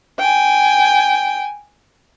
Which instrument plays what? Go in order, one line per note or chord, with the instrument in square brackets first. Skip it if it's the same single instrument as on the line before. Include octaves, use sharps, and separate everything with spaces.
[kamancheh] G5 G#5